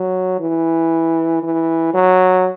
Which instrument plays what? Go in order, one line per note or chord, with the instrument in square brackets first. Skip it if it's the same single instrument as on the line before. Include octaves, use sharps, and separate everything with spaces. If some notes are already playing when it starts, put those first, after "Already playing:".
Already playing: [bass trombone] F#3
E3
E3
F#3